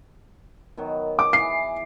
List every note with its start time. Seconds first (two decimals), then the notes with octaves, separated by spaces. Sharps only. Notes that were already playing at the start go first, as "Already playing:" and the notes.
0.77 B2 D#3 F#3
1.19 G#4 D6
1.33 E3 C7